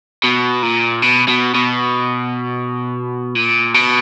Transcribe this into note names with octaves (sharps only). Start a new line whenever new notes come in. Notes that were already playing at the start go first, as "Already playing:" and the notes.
B2
A#2
B2
B2
B2
A#2
B2